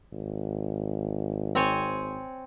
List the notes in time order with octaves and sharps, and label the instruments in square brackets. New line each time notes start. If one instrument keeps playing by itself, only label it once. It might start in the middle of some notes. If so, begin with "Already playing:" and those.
[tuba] G#1
[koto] C4 C#5 G#5